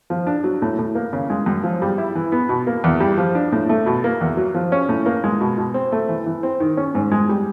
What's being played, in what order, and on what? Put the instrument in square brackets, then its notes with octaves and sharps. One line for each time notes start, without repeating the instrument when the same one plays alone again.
[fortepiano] F3
D4
F#3
A2
A2
A#3
C#3
G#3
F#2
F3
G3
E4
E3
B3
B2
A#3
E2
G3
F3
D4
A2
A3
B2
A#3
E2
F#3
F3
C#4
A2
A#3
G#3
B2
B2
C4
A3
E3
E3
C4
D#3
C#4
G#2
G#3
G3